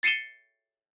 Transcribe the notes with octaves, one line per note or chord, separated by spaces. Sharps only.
A6 C7 C#7 D#7 E7 G7